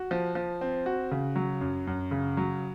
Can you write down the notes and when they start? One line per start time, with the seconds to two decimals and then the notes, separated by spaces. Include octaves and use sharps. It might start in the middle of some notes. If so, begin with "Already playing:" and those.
Already playing: F#4
0.11 F3
0.35 F3
0.61 C4
0.86 F#4
1.11 C#3
1.36 F#3
1.61 F#2
1.87 F#2
2.11 C#3
2.37 F#3